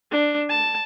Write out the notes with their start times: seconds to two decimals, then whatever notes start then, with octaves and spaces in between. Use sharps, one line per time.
0.11 D4
0.49 A5